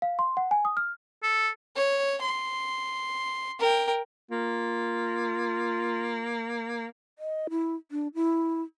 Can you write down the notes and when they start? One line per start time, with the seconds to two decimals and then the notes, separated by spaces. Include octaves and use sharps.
0.02 F5
0.19 C6
0.37 F#5
0.51 G#5
0.65 D#6
0.77 F6
1.23 A4
1.76 C#5
2.22 C6
3.59 A#4 G5
4.31 A#3 F4
7.19 D#5
7.50 E4
7.91 D4
8.15 E4